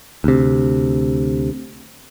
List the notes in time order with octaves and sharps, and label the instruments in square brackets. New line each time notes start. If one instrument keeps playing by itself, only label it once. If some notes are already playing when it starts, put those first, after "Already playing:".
[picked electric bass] D2 C3